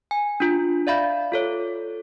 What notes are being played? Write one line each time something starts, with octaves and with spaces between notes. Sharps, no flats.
G#5
D4 F4
D5 E5 F5 B5 G6
F4 A4 C#5